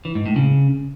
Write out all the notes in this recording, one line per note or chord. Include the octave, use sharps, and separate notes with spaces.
E3
G#2
A2
C#3